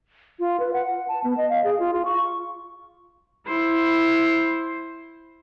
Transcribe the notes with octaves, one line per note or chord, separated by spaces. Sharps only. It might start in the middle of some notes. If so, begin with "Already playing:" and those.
F4
B4
F#5
F#5
A5
B3
D#5
F5
G#4
F4
F4
C#6
E4 C5